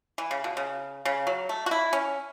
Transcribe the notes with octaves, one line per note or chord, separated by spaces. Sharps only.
E3
C#3
B2
C#3
C#3
F#3
A3
F#4
E4
C#4